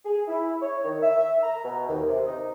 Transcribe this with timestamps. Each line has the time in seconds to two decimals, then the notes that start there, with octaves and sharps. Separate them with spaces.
0.05 G#4
0.27 E4
0.61 C#5
0.84 D#3
1.02 E5
1.43 A#5
1.64 B2
1.88 D#2
2.07 C3
2.26 D#4